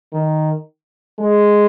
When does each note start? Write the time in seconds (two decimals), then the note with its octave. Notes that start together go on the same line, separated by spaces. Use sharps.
0.12 D#3
1.19 G#3